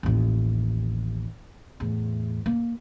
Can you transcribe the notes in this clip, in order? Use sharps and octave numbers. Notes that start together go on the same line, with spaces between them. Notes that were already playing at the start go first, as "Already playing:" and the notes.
A1 D#2
E2 A2
A#3